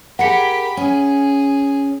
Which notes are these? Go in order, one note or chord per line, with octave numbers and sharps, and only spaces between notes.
G4 G#4 A#4 F#5 B5 C#7
C#4 G#4